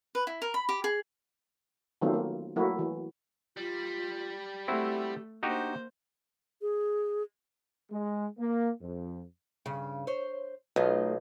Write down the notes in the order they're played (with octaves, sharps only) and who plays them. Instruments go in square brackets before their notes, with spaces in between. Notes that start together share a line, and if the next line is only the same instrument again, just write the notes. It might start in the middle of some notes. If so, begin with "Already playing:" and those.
[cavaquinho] B4
E4
A#4
B5
G4
G#4
[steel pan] D#3 F#3 A3 B3 C4 F4
A#3
F#3 A3 A#3 E4 F#4
E3
[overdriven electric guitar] G3 [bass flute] F4
[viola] A3 [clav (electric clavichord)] C4 E4 F#4 [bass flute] G4
[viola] A#3 C5 [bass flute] D4 [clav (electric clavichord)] D#4 F#4 G4
[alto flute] G#4
[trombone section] G#3
A#3
F2
[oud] G2 C#3
C5 C#5
[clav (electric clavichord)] B1 [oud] A3 D#4 F4